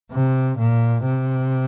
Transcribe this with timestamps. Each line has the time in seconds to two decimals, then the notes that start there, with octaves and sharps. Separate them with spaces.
0.12 C3
0.58 A#2
1.04 C3